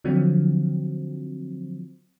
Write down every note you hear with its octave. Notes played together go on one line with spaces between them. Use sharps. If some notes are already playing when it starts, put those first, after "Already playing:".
D3 F3 F#3 C4